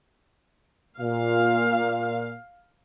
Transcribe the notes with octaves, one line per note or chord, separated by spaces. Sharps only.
A#2 F5